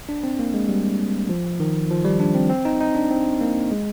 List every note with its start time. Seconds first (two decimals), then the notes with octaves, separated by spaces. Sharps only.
0.09 D4
0.24 C4
0.39 A#3
0.54 G#3
0.69 G3
1.29 F3
1.60 D#3
1.90 F3
2.05 G3
2.20 D4
2.35 C4
2.50 C4
2.65 D#4
2.81 D#4
2.95 D4
3.11 C4
3.41 A#3
3.71 G#3